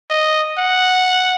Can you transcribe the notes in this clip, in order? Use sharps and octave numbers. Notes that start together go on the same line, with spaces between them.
D#5
F#5